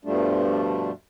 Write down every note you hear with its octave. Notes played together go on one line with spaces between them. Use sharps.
G2 B2 F3 G3 A3 D4